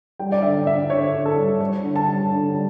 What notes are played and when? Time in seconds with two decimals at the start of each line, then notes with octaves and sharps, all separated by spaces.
0.20 G3 G5
0.32 D5
0.42 D3 E5
0.67 D3 E5
0.90 D3 C#5
1.13 D3
1.26 A4
1.37 G3
1.61 G3 C#5
1.84 D3
1.96 A5
2.08 G3
2.32 D3
2.54 G3